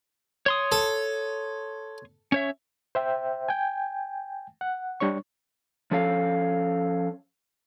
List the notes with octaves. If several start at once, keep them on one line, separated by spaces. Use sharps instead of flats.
C#5 C6 D#6
A4
C#4 C#5 E5
C5 E5 G5
G5 G#5
F#5
G3 D4 C#5 C#6
F3 C#4 A4 C#5 F5